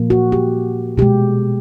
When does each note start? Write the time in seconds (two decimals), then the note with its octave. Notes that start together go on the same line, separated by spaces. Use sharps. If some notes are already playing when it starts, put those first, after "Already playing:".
Already playing: A#2 F3 A#3
0.10 F#4
0.32 G4
0.97 B2 G#3 G4